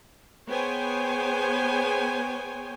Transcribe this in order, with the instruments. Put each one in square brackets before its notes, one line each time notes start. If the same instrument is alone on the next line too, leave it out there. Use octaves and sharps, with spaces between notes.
[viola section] B3 G#4 C5 C#5 G5 G#5